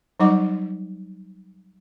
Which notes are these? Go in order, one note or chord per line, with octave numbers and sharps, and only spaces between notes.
F#3 G3 D#4 D#5 F#5 D6